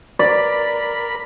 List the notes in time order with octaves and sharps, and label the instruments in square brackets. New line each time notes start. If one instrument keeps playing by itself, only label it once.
[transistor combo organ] A#4 B5 [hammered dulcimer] D5